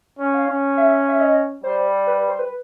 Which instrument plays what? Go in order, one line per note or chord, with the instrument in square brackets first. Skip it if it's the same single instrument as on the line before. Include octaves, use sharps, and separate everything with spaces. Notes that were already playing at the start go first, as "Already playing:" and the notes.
[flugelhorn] C#4
[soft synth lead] F5
[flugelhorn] C#4
[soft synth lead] E5
E5
D#5
[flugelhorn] G3 [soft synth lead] C5
[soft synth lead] B4
C5
B4